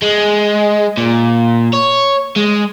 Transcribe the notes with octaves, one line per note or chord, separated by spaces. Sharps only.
G#3
A#2
C#5
G#3